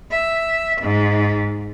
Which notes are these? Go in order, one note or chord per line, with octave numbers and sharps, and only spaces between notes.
E5
G#2